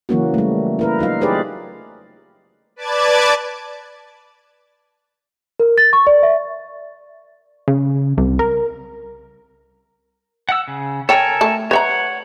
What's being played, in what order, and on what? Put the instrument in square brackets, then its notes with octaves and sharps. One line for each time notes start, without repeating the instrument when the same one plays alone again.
[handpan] C#3 E3 F#3 A#3 C#4 F#4
G3 A3
E4 A#4 B4
F#3 D#4 F4 F5
D#4 G4 G#4 B4 C5 D5
[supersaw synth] B4 D5 A5 D6 G#6 A6
[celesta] A#4
A6
C#6
D5
E5
[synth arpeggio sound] C#3
C2
A#4
[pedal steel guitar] F#5 E6
C#3
[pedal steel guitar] A4 A#4 G#5 [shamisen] C#5 G5
[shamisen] A3 A5
[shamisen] B4 E5 A#5 [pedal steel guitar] C#5 F#5